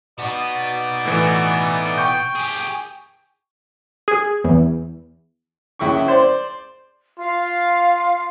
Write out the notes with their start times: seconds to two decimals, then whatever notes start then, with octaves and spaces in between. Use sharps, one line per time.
0.18 B2 B3 D#4 D5
1.05 A2 E3
1.98 G5 C#6 G6
2.36 G4 G#4
4.08 G#4
4.44 E2
5.79 C#2 E4 G5 C#6
6.08 C5 D5
7.19 F4 F5